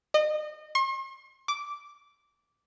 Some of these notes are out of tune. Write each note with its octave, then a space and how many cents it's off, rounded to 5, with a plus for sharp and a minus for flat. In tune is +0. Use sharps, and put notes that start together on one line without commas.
D#5 -30
C6 +45
D6 -10